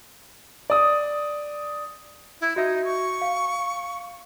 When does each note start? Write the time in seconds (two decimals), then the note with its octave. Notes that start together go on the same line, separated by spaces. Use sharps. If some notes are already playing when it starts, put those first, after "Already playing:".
0.70 D5 D#6
2.41 E4
2.56 D#4 F#4 E5
2.84 C#6
3.21 F5